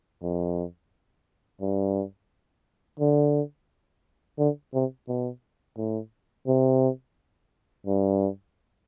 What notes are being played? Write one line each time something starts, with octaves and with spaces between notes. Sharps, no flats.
F2
G2
D3
D3
C3
B2
A2
C3
G2